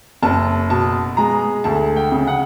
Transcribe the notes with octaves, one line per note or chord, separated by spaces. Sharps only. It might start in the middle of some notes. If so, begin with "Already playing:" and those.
F#1 A5
B2 A5
G#3 A#5
D2 A5
G5
C#3
F#5